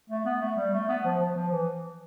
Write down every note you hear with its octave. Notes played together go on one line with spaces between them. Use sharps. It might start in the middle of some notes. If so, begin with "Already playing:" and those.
A3
B3
A3
G3
A3
B3
F3
F3
F3
E3